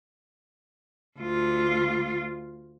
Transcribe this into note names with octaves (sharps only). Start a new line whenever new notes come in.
D2 F4